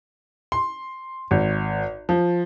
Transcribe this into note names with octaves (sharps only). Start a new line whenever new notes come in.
C6
G#1
F3